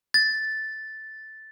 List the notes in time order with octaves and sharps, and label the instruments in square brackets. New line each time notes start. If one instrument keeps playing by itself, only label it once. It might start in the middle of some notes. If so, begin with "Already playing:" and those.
[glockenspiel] A6